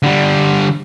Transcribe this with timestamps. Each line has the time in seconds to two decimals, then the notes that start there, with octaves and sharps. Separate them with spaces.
0.03 D3 G3